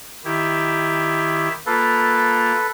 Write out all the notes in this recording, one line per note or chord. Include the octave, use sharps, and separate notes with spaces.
D#3 E4 G4
A#3 F4 A4 B4